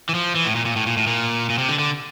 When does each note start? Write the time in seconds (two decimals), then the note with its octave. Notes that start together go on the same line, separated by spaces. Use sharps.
0.09 E3
0.15 F3
0.35 E3
0.45 A2
0.55 A#2
0.65 A#2
0.76 A2
0.86 A#2
0.97 A2
1.07 A#2
1.50 A#2
1.58 C3
1.69 D3
1.79 D3